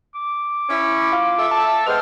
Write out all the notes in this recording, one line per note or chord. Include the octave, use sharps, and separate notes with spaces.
D6
C#4 E4
F4
A4 E5
A5
G#3 B3 C4 F6